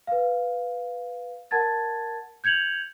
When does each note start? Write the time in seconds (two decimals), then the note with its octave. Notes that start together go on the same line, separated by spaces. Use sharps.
0.07 B4 F5
1.51 A#4 F#5 A5 G#6 A6
2.44 G6 G#6 C#7 F7 F#7